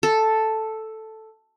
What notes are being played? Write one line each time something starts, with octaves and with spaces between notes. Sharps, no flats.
A4